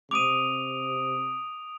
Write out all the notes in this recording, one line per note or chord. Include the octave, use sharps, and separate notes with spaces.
C3 D6 D#6 D7 D#7 F7